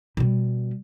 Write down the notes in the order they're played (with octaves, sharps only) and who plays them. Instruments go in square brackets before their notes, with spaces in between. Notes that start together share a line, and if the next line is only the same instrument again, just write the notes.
[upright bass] B2 G3